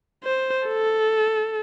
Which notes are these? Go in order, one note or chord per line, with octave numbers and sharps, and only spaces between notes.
C5
A4